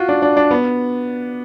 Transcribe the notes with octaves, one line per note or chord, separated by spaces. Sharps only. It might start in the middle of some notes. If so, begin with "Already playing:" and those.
Already playing: F4 F#4
D4
D4
D4
B3